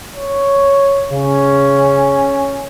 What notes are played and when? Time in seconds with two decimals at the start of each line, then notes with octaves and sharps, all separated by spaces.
0.16 C#5
1.11 C#3 C#4